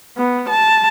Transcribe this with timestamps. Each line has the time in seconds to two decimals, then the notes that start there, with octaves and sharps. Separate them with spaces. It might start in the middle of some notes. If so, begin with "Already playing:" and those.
0.17 B3
0.49 A5